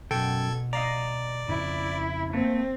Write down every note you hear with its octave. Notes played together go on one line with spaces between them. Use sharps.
F#2 B2 A4 G5 G#6
D5 D#5 F5 A#5
F2 C#3 E4
A3 A#3 C4